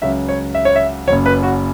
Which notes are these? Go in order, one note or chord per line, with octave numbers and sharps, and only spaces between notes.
C#2 C#3 F#3 E5
C#5
E5
C#5
E5
F#1 F#2 F#3 C#5
B4
F#4